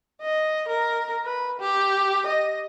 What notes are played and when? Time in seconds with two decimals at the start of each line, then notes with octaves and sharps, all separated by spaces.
0.22 D#5
0.68 A#4
1.24 B4
1.60 G4
2.26 D#5